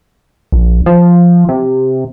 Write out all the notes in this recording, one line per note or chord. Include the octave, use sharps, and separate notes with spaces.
A#1
F3
C3